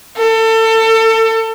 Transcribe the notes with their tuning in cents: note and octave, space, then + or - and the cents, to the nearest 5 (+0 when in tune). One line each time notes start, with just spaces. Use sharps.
A4 +30